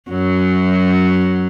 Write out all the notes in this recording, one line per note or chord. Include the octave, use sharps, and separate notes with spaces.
F#2 F#3